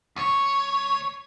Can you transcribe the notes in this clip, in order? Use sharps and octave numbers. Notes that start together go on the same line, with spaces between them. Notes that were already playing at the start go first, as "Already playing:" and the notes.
D2 C#5